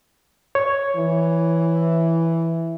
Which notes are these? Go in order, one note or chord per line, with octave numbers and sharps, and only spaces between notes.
C#5
E3